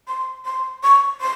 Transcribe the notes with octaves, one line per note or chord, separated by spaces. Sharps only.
C6
C6
C#6
C6